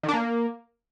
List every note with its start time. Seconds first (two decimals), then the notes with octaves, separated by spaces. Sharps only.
0.03 D#3
0.08 D4
0.13 A#3